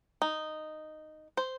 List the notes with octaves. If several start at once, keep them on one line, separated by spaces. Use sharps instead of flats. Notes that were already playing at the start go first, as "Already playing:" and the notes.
D#4
C5